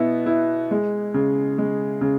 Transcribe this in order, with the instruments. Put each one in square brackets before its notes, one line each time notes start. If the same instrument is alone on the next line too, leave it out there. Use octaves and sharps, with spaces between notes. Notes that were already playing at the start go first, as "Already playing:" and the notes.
Already playing: [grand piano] B2 B3 E4
E4
G#3
C#3
G#3
C#3